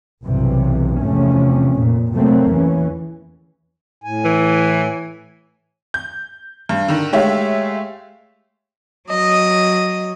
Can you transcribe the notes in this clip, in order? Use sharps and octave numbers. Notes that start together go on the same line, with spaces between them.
B1 G2 C3 E3
E2 C3 F3 A3 C#4
F2 A#2
C3 F#3 A3 A#3 C4
E2 E3 C#4
A2 G#5
E3
G6
G2
D3 D#3
G#3 A3 G4 C#5 E5 F5
F#3 D#5